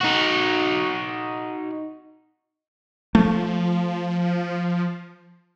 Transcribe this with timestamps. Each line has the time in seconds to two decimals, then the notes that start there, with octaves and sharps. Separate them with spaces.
0.01 D#4 F#4
3.15 F3 A3